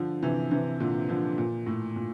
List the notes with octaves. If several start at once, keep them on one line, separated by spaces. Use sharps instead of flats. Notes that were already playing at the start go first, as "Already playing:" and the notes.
Already playing: D3 F3
C3 E3
C3 E3
A#2 D3
D3 F3
A#2
A2
A#2